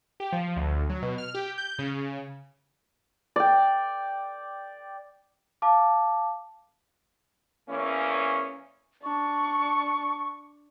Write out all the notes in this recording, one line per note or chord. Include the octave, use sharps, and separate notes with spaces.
G4
F3
D2
F#3
B2
F6
G4
G6
C#3
D5 G5
F5 A5 D6
E2 E3 A#3 C#4
D4 C#6